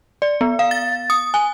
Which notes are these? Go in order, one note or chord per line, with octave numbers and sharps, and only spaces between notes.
D5
B3
F5
A6
D#6
G#5